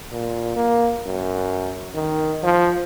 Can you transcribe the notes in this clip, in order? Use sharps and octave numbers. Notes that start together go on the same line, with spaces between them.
A#2
A#3
F#2
D#3
F3